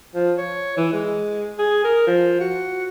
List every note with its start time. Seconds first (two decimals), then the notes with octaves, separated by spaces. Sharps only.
0.15 F3
0.38 C#5
0.77 E3
0.93 G#3
1.58 G#4
1.84 A#4
2.07 F3
2.40 F#4